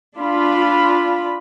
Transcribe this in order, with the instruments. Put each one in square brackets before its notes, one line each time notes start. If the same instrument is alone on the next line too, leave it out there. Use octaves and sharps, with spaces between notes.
[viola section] D4 F4 B5